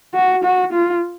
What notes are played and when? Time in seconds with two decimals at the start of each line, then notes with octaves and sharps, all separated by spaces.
0.15 F#4
0.44 F#4
0.73 F4